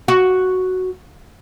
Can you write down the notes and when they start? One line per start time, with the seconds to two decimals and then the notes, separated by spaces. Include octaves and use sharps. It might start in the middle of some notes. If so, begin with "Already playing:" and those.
0.08 F#4